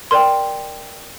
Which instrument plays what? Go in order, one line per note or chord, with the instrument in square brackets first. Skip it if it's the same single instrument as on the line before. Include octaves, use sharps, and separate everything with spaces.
[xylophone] A#4 D5 G5 C6